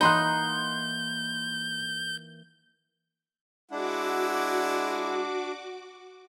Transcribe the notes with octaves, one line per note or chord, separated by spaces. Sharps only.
E3 A#3 D#4 F#5 B5 C6 F#6 G6
G#3 D4 E4 F#4 F#5 D6